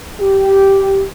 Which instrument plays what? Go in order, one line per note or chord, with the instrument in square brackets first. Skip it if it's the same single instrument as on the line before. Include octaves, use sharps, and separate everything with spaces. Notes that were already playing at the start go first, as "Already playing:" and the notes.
[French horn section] G4